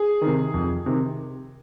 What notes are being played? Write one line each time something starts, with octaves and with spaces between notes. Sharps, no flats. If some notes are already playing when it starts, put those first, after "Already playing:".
Already playing: G#4
C3 D#3
F2
C3 D#3